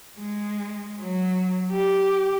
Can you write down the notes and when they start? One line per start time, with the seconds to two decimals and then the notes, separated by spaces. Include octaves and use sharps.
0.19 G#3
1.01 F#3
1.72 G4